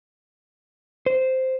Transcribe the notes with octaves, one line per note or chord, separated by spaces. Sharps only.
C5